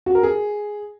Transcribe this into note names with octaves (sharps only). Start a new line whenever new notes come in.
F#4
A#4
G#4